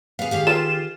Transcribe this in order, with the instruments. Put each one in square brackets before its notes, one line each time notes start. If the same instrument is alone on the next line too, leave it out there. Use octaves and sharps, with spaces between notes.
[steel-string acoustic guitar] B3 G#4 [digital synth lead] F5
[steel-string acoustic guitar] D#3 G4 G#4 [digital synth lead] F5
[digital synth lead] F4 [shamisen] A4 B4 F5 [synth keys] E7